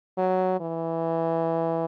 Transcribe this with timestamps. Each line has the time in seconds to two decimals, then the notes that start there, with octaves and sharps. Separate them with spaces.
0.18 F#3
0.60 E3